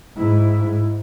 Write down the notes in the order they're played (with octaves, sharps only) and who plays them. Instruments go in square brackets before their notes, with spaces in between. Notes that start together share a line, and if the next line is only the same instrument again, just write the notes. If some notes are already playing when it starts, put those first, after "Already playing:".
[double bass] G#2 E4